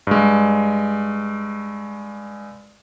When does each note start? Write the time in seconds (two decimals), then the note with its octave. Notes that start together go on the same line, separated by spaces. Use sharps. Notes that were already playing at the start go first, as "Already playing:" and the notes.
0.07 G2 G#3